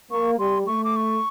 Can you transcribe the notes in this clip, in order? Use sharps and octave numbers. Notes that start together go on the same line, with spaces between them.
A#3 C#6
G3 C6
A3 C#6
D6
C#6